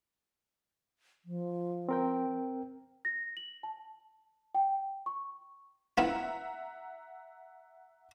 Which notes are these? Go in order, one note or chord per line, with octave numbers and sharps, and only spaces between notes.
F3
C4 A#4 G5
A#6
F#7
A5
G5
C#6
B3 E4 F4 E5 F#5 A#5